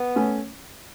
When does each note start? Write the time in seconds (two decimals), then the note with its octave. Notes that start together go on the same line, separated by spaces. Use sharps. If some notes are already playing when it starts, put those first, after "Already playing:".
Already playing: B3
0.16 A3 C#4